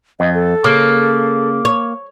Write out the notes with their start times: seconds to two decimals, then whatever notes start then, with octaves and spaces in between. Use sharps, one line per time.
0.20 F2 D#5
0.34 A4
0.64 C#3 A#3
1.65 C#5